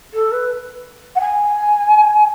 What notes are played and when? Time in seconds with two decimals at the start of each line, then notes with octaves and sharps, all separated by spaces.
0.14 A4
0.32 B4
1.16 F#5
1.21 G#5